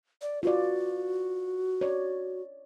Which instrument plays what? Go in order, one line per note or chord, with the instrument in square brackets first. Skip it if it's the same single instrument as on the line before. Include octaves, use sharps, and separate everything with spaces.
[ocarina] D5
[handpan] F4 B4 D5 [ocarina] F#4
[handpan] C#5 D5